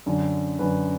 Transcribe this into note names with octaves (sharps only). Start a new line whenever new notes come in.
F#2 D3
F#2 D3 B4